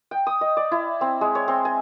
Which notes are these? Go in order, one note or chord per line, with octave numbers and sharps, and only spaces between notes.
G5
D#6
D#5
D5
E4
C4
G#3
C#5
C4
G#5